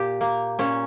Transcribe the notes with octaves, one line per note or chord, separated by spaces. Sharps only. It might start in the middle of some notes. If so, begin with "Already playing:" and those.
Already playing: A#2 G4
A#3
A#2 C#4